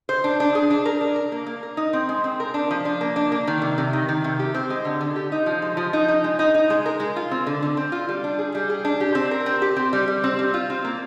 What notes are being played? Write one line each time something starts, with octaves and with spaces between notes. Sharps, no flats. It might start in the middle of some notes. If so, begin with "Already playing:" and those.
C5
D4
D4
G#4
D4
A#4
D4
A#4
A#3
A#3
A#4
D#4
C4
G#3
C4
A#4
D4
F3
D4
A#3
D4
A#3
D#3
C3
C3
D#3
D#3
C3
G4
C4
G#3
D3
D3
G4
D#4
F3
G#3
F3
D#4
D#4
G#3
D#4
D#4
G#3
A#4
G#3
F4
C4
D3
D3
C4
F4
G3
D4
G#4
G3
G#4
D4
G4
C4
A#4
C4
G4
C4
G3
G3
C4
G3
F4
C4
A#3